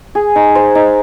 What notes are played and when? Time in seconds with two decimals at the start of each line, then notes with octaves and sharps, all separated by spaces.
0.15 G#4
0.36 D#4
0.55 C5
0.75 D#4